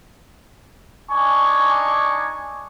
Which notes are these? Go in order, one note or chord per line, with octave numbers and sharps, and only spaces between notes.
D4 D#4 G#5 C#6 D6